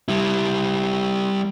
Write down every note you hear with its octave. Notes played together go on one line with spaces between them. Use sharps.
G3 E4